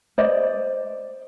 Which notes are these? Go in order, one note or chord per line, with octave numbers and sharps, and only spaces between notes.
C5 D5 D#5